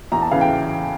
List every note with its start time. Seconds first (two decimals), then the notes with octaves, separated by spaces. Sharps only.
0.12 E2 A#5
0.22 A5
0.31 C#3 E3 F5
0.41 G5